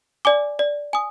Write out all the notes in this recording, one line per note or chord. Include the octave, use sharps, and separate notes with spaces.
D5 G#5 D6
D5
G#5 D#6